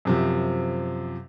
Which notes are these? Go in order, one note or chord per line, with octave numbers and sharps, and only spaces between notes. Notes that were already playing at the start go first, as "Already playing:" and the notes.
F#2 C3 F3